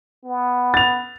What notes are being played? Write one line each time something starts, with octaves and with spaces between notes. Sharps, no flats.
B3
A6 F7